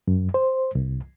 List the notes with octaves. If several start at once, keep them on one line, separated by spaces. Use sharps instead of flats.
F#2
C5
C2